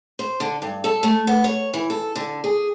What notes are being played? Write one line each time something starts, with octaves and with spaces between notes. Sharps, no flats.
C5
D3
G2
A4
A3
B3
C#5
E3
A4
D3
G#4